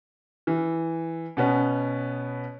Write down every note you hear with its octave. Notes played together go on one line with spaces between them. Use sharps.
E3
B2 B3 C#4